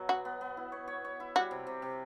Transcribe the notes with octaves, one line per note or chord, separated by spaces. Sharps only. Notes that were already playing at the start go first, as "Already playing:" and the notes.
Already playing: B2 F#3
B3 F#4
B3
B3
E4
C#5
C#5
C#5
E4
G3 F#4
C3
C3
C3